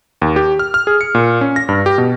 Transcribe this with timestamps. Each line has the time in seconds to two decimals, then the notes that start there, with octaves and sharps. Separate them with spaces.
0.22 D#2
0.36 G4
0.59 F6
0.74 F6
0.87 G#4
1.01 C#7
1.15 A#2
1.41 C#4
1.56 A#6
1.69 G2
1.86 G4
1.98 B2